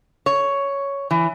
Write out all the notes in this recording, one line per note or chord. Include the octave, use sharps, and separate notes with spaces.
C#5
E3